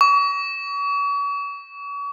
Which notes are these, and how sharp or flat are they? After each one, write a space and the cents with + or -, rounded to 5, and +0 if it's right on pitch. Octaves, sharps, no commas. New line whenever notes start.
C#6 +40